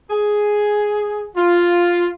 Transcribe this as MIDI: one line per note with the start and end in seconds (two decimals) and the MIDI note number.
0.10 1.26 68
1.36 2.10 65